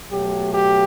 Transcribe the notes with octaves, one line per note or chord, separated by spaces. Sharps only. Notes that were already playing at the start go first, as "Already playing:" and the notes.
B2 F#3 A3 G4
G4